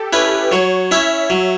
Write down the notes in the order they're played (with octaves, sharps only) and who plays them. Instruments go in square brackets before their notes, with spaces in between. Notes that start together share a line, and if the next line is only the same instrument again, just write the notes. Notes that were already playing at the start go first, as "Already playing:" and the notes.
Already playing: [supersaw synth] G4 A4
[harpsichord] C#4 E4 [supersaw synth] B4
[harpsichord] F#3 [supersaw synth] C#5
[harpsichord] C#4 E4 [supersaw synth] E5
[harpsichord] F#3